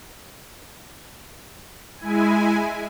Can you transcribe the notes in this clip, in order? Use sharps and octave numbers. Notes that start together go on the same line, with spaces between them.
G#3 E4 G#5